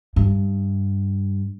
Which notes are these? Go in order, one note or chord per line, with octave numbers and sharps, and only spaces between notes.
G2